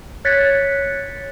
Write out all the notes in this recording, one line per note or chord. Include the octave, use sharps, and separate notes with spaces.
C#5 F#6 G#6 A6 B6 C#7